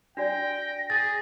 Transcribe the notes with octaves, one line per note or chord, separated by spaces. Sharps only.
D4 F#4 D5 G5 A#6
G#4 A6